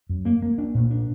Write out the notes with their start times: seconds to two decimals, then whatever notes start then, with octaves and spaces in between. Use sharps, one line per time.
0.09 F#2
0.25 A#3
0.42 A#3
0.58 D4
0.75 A#2
0.90 D4